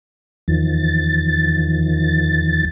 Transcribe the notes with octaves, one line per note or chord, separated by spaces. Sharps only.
E2 D#3 F3 A6